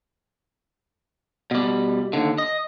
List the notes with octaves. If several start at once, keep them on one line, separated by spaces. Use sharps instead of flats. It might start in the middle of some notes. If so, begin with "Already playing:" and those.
B2 G3
D#2 D3
D#5